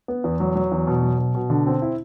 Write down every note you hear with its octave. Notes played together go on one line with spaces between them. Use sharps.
B3
E2
F#3
F#3
E2
B2
F#3
B2
B2
D3
C4
E4